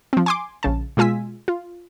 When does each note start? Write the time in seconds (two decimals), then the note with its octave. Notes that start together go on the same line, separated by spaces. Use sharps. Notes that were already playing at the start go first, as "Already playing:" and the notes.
0.13 F3 C4
0.26 G#5 C6 D6
0.63 A#1 C#3 A5
0.97 B2 G#3 F4 G#5 E6 B6
1.48 F4